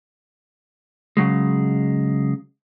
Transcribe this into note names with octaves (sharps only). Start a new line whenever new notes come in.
C#3 F#3 G#3